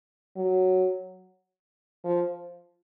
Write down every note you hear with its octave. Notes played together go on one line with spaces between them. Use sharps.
F#3
F3